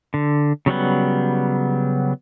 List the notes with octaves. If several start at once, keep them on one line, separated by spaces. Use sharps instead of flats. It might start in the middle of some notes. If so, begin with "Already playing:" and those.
D3
C#3 F#3 G3 B3